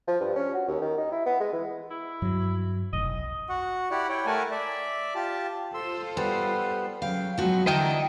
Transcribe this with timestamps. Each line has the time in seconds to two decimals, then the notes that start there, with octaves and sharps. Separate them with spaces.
0.07 F3
0.21 G2
0.36 C#4
0.54 F#4
0.68 D#2
0.82 D#3
0.98 D#4
1.12 E4
1.26 B3
1.40 G#3
1.52 E3
1.91 E4
2.22 G2 F#3
2.93 F1 B1 D#5
3.49 F#4 F#5
3.91 E4 G4 D5 F#5
4.09 E4 C#5 G5
4.26 A3 A#4 F#5 G#5 A5
4.51 D5 E5
5.15 F4 G4 A5
5.74 F4 A4 C5 C6 E6
6.17 G3 B3 B4
7.02 C#3 F#3 F5 G5
7.38 F3 F#3 G#3 B3 F#4
7.67 D3 E3 E4 D#5 G5 A5 A#5